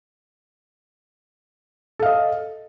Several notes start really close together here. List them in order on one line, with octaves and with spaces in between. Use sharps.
A4 F5 D#5